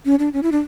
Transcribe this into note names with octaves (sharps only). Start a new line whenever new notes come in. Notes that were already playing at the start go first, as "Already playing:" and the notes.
C#4
D4
C#4
E4
D4